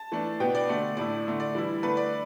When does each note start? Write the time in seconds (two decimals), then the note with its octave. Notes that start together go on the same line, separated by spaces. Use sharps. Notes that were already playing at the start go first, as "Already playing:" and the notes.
Already playing: A5
0.12 E3 A3 D4
0.40 B2 B3 D4 G5
0.55 D5
0.69 D3 A3 D4
0.97 A2 A3 E4 D5
1.25 D3 A3 D4
1.40 D5
1.55 E3 G3 E4
1.83 D3 A3 D4 B4
1.97 D5